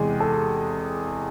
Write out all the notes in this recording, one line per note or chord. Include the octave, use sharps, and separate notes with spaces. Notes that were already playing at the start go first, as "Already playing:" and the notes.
Already playing: E2 C3 G#3 G#4
A4